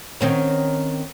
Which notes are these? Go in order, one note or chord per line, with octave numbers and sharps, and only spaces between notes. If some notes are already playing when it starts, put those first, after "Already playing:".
D#3 C4 C#4